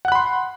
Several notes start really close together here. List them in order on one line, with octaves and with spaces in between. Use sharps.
F#5 F#6 B5 C6